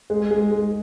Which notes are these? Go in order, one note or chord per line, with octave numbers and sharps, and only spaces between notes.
G#3
G#3
G#3